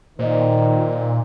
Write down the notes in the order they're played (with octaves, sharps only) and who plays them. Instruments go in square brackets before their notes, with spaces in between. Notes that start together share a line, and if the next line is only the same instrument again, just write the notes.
[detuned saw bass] A#2 [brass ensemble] D#3 [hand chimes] C5 D5 D#5